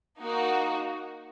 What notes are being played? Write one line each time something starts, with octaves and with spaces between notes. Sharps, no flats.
A#3 D#4 F#4